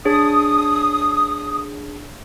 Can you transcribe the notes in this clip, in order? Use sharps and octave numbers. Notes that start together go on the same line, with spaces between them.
D4 G#4 C#5 D#6